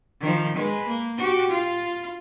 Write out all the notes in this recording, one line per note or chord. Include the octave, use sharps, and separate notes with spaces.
D#3 F3
G#3 B4
A#3
F#4 G4
F4